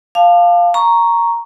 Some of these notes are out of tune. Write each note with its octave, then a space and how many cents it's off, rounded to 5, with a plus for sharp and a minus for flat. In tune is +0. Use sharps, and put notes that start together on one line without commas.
F5 +0 A5 +0 D6 +40
A#5 +0 C#6 +0